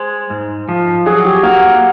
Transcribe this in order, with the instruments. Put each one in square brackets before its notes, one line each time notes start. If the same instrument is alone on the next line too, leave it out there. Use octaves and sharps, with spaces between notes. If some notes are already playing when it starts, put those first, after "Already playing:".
Already playing: [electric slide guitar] G#3 [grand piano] C5
[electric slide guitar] G#2
F3
[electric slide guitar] F#3 [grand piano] G#4
[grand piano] G4
[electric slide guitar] A#3 [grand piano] F#4